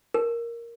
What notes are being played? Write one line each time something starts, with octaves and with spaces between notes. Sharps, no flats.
A#4